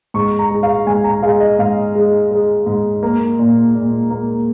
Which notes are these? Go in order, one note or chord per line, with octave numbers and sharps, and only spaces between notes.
G#2 C#6
A#5
G#3
F5
G#2 G#5
A#5
G#3 F5
D#5
G#2 F5
G#3
G#3
G#2
A#3
A#2
A#2
A#3